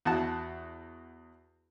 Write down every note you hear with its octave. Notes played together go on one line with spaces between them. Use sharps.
E2 F#4 A5